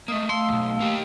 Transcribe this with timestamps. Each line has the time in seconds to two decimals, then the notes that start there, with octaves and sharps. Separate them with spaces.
0.08 A3 A#3 D#5 D#6
0.29 A3 F5 C6 E6
0.49 B1 E2
0.80 A#3 G4